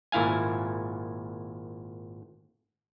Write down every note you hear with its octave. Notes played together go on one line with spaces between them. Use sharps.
G#1 A#2 E4 F5 G#5